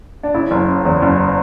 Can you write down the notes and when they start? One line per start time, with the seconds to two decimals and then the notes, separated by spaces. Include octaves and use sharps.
0.23 D4
0.34 C#3 E4
0.51 F#1
0.68 C#3
0.85 E2
1.02 F#1